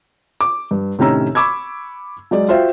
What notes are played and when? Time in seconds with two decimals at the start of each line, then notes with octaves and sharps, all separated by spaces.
0.41 D6
0.71 G2
0.99 A2 C3 D#3 C#4 A#5 E6
1.35 B5 C#6 D6 E6 G#6
2.31 F#3 G#3 D5
2.49 F4 F#4 C5 E5 F5 G5